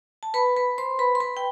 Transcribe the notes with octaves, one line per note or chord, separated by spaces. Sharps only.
A5
B4 B5
B4 B5
C5 C6
B4 B5
C6
B4 B5
G5